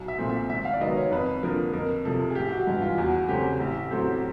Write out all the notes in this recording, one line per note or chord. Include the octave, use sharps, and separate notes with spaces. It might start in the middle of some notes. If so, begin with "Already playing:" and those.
Already playing: B1
E5
A#2 F3 A3 C4
E5
G#1 E5
F5
D5
G#2 D#3 F#3 B3 D#5
C#5
F2 B4
D3 F3 A#3 A#4
F2 A#4
C3 F3 A4
G#4
A1 G4
F#4
G2 E3 G#3
F4
E2 F#4
C#3 F#3 A3 C4 G4
A1
A2 F#3 A3 C4